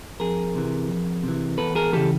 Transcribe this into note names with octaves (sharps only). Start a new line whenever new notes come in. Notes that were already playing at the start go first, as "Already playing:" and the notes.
F2 G#4 A#4
C3 E3
F2
C3 E3
E2 A4 B4
G#4 A#4
C#3 E3 G4 A4